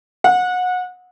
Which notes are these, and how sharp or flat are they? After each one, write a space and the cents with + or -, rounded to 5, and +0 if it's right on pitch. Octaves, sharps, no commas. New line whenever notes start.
F#5 -25